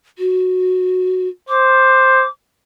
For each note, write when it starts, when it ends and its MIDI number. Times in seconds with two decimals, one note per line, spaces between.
0.19 1.28 66
1.49 2.25 72
1.49 2.29 86